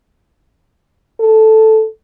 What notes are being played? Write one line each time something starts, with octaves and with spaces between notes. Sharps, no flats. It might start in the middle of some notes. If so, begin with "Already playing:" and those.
A4